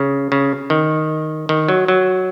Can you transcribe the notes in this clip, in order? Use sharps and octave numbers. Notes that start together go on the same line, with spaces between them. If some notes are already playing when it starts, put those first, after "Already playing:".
Already playing: C#3
C#3
D#3
D#3
F#3
F#3